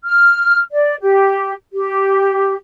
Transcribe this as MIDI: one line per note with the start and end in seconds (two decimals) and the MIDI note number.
0.05 0.60 89
0.72 0.94 74
1.01 1.51 67
1.72 2.54 67